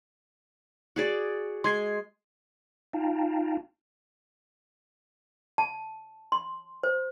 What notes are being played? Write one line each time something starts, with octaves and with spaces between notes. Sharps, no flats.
F#4 G#4 D5
G#3 C6 G#6 C7
D#4 F4 F5 G5 A5 A#5
A5
C6
C5